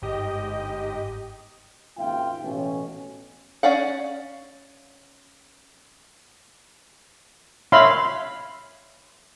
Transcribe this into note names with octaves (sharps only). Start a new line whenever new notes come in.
G1 G#2 G4 D#5
G#1 D#2 C#3 F4 E5 G5
A1 B2 C#4
C#4 D5 F5 F#5
C#5 E5 F5 B5 C6